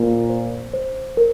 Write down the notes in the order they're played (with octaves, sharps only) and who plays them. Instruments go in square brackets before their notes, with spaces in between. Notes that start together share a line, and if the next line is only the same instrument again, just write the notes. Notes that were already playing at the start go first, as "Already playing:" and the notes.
Already playing: [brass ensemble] A#2 [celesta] C5
[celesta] C5
C5
A#4